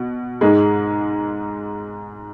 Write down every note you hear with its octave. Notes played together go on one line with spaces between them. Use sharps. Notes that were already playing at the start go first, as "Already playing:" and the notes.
Already playing: B2
G#2 G#3